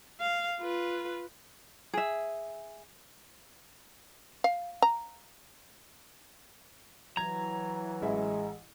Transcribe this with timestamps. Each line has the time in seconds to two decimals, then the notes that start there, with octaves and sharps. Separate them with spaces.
0.20 F5
0.60 F4 B4
1.94 G#4 E5
4.44 F5
4.82 A#5
7.17 E3 F#3 A#5 G#6
8.02 A1 G#3 E4